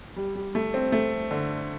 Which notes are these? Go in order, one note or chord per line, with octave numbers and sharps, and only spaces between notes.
G3
G3
A3
C4
A3
D3